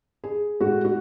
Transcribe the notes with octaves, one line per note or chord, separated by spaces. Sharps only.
G#4
A2 G#3 F#4
F#4